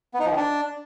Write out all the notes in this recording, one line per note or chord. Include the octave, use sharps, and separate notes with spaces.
B3
D#4
F3
D#3
D4